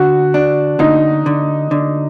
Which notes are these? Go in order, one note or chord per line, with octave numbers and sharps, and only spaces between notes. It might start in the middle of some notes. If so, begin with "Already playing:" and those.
Already playing: D3 F#4
D4
D3 D#4
D3
D3